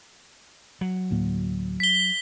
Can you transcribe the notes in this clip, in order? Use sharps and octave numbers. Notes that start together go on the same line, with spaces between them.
F#3
D2 A2 A#3
B6 G7